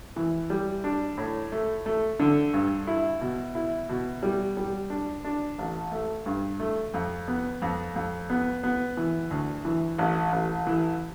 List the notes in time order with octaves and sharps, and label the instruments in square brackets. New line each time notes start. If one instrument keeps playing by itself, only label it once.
[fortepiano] E3
G3
D4
A2
A3
A3
D3
G2
E4
B2
E4
B2
G3
G3
D4
D4
A1
A3
G2
A3
F2
B3
F2
F2
B3
B3
E3
D2
E3
A1
A1
E3